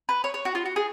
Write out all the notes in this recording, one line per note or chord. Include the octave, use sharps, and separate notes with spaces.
B4
C#5
C#5
F#4
F4
F#4
G#4